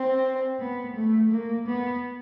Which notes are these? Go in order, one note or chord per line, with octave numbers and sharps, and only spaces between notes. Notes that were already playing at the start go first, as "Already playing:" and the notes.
Already playing: C4
B3
A3
A#3
B3